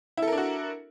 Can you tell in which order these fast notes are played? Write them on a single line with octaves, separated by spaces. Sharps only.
E4 A4 A#4 D4 F#4